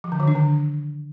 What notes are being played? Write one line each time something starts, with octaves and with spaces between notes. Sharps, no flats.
F3
D3
D#3
D4
D3